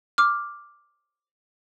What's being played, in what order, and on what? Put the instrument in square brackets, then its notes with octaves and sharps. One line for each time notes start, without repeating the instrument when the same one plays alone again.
[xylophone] D6 F6